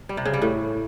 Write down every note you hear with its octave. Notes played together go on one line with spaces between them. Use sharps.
G3
C3
C#3
G3
A2